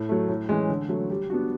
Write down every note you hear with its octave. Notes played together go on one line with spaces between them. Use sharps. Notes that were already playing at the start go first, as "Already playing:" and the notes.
Already playing: A2
F#3 A3
A2
E3 G#3 C#4
D3
F#3 A3
G3
B3 D4 F#4